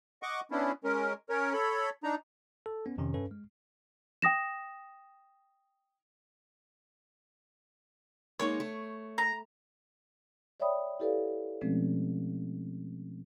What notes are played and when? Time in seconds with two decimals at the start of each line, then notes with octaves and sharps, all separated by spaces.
0.23 D#5 F#5 C#6 D6
0.51 B3 C#4 D4 E4
0.84 G#3 C#4 A#4
1.30 C#4 A#4 C#5
1.53 A4 C#5 B5
2.04 D4 D#4 A#5
2.66 A4
2.86 B3 C#4
2.98 F2 C3 D#3 C#4
3.14 G2 C#4 A4 B4
3.31 G#3
4.22 G5 D#6 A#6 E7
8.40 G#3 A#3 D#4 C#5
8.60 A3
9.18 A#5
10.60 C#5 D5 E5 G5 B5 D#6
11.00 E4 G4 A4 B4 D5 F5
11.61 B2 F3 G#3 A3 C4 C#4